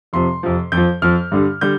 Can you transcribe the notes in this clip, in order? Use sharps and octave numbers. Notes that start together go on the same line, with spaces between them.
F2 C3 F3 C6
F2 C3 F3
F2 G6
F3
F2 F3 F6
G2 D3 G3
D3 G3 G6